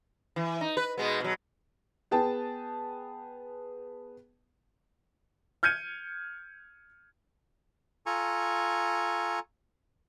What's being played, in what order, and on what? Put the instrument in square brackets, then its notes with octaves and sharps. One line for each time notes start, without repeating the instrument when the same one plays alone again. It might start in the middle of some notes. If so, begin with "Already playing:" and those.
[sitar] E3
D#4
B4
B2 G#3 B3
B2 F#3
[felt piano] B3 G#4 G5 A5
[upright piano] F6 G6 G#6 C#7 D#7
[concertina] F4 A4 G#5 A#5 C#6